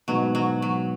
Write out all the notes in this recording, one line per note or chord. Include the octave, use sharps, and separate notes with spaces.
G#2 B2 F#3
F#3
F#3